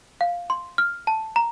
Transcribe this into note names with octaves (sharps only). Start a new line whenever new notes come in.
F5
C6
F6
A5
A#5